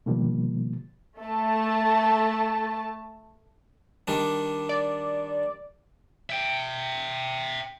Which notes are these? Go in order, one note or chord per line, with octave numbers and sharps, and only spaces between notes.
B2 D3 D#3 F3 G3 A#3
A3 A5
D#3 G3 D4
D5
E5 G5